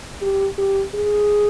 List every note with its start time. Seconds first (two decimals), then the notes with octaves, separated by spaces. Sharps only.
0.22 G4
0.58 G4
0.95 G#4